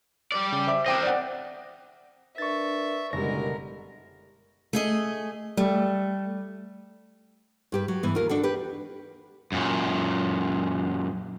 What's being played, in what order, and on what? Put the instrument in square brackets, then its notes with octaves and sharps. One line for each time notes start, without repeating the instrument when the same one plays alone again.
[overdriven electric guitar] G3 D5
[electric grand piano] C#3
C5 E5 D6
[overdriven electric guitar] C4 D#5 [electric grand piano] C5 G5 D6
[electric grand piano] D5 F#5
[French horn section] D4 A#4 B4 [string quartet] E5 [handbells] C#6 A6
[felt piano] F#1 G3 [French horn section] B2 D3 [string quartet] G#3 A#4 [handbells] A#6
[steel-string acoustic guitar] A3 G#4 D#5
[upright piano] G3 [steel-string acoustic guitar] A3
[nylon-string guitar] G2 G4 B4
F#3
G2 E3 B3
D#2 F4 A#4
D4 F#4 A4
G4 B4
[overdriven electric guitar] F#2 A#2